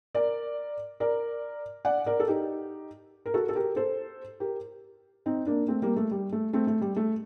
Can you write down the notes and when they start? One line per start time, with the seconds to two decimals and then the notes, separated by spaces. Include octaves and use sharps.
0.15 A#4 D5
1.00 A#4 D5
1.85 D5 F#5
2.06 A#4 D5
2.20 A4
2.28 D#4 G4
3.26 A#4
3.34 F#4 A4
3.49 A4
3.55 G4 A#4
3.76 A4 C5
4.40 G4 A#4
5.26 C4 D#4
5.47 A#3 D4
5.68 A3 C4
5.82 G3 A#3
5.96 A3
6.11 G3
6.33 A3
6.54 A3 C4
6.67 A3
6.81 G3
6.97 A3